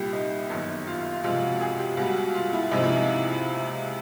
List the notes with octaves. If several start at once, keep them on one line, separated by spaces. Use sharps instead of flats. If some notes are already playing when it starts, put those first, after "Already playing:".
Already playing: C2 A#2 G3 G4
D#4
G1 F#2 D#3
F4
F4
C#2 C3 F3 G#3 F4
F#4
G#4
G4
C#2 B2 G3 F#4
F#4
F4
E4
C#2 C3 F3 D#4
E4
D#4